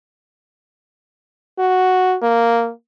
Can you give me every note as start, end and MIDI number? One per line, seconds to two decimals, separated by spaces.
1.59 2.16 66
2.22 2.71 58